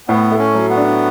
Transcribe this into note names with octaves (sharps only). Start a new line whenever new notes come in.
A2 B3
A3
C#4
F#3
B3
D4